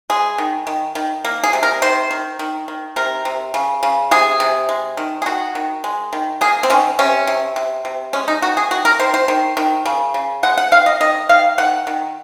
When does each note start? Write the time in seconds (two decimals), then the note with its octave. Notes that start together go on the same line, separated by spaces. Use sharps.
0.10 G#3 G#4
0.38 D#3
0.67 D#3
0.95 D#3
1.25 A#3
1.44 G#4
1.53 C3
1.63 A#4
1.82 D#3 C5
2.11 D#3
2.39 D#3
2.68 D#3
2.96 C3 A#4
3.25 C3
3.54 C#3
3.83 C#3
4.11 C3 G#4
4.40 C3
4.69 G#3
4.97 D#3
5.22 G#4
5.26 D#3 F#4
5.55 D#3
5.84 G#3
6.13 D#3
6.41 A#3 G#4
6.63 C4
6.70 D#3 C#4
6.99 C3 C#4
7.27 C3
7.56 C3
7.85 C3
8.13 G#3 C#4
8.28 D#4
8.42 D#3 F#4
8.57 G#4
8.71 D#3 F#4
8.85 A#4
8.99 D#3 C5
9.14 C5
9.28 D#3
9.57 D#3
9.86 C#3
10.14 C#3
10.43 G#3 F#5
10.58 F#5
10.72 D#3 F5
10.86 D#5
11.01 D#3 D#5
11.29 D#3 F5
11.58 D#3 F#5
11.87 D#3